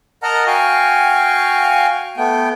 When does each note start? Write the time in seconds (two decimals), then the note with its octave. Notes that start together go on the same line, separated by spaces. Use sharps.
0.23 A#4 D#5 F#5 A5 A#5 F6
0.47 F#4 F5 G5 G#5 C#6
2.17 A3 B3 G5